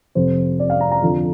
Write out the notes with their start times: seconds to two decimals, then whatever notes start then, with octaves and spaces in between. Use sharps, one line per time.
0.15 F2 C3 F3 C5
0.60 D5
0.70 F5
0.80 A#5
0.91 A#5
1.02 F2 D3 F3